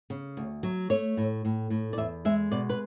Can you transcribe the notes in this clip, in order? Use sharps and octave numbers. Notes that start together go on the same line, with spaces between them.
C#3
D2
F#3
A3 C#5
A2
A2
A2
D5
E2 E5
G#3 E5
B2 D5
B4